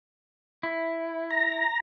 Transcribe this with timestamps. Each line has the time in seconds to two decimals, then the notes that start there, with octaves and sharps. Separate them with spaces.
0.63 E4
1.31 A#5